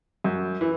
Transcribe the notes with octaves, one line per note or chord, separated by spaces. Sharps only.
F#2
E3